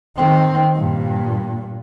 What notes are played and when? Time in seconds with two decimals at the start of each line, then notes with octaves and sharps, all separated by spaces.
0.16 D#3 C4
0.75 G2 A#2